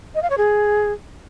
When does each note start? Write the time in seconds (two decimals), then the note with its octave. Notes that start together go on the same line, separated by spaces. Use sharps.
0.15 D#5
0.22 F5
0.30 C#5
0.38 G#4